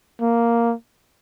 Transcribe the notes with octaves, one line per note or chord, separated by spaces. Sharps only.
A#3